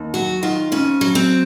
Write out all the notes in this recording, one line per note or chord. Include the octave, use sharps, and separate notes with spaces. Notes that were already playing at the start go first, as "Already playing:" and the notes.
Already playing: D#2
F#3 F#4
D#3 F4
F2 C#4
F#3
C4